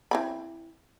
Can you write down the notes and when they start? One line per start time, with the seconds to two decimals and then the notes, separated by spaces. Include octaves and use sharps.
0.11 E3 C4 B5